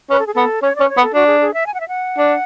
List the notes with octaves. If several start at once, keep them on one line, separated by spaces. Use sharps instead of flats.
C#4 B4
A4
G#4
B3 A4
C#4 C#5
C#4 D5
B4
C#5
B3
A4
D4 F#4
G#4
G#4
E5
G#5
F#5
E5
F#5
D4